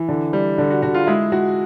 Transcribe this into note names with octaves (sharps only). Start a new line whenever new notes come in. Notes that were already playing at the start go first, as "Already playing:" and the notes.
Already playing: E3
D3
G3
D3
F#4
D3 F#4
F4
G#3 E4
G#3 F#4